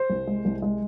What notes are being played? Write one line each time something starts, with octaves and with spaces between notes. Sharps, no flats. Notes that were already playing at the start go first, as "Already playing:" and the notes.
Already playing: C5
C2
G#3
C2
G#3